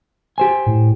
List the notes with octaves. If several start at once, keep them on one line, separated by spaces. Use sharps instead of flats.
G4 C5 G#5
A2